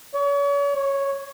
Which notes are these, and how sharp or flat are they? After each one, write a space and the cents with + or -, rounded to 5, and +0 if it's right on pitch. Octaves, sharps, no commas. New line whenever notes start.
C#5 +40
C#5 -5